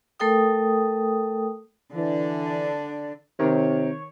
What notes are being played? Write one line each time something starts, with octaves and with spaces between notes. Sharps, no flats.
A3 A4 A#4 G5 D#6
D3 E3 D4
C3 D#3 A#4 C#5